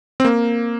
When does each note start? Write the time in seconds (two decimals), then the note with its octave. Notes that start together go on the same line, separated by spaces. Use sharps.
0.20 C4
0.25 A#3